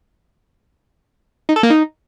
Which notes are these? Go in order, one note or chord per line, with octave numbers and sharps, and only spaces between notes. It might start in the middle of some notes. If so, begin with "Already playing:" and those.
D#4
A4
A#3
D#4